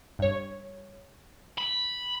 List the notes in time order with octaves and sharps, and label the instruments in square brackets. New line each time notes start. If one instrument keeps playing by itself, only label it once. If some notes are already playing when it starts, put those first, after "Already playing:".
[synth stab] G2 C#5
[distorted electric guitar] B5